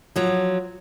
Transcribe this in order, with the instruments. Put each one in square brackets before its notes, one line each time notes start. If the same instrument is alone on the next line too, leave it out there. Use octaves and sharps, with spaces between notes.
[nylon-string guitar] F3 F#3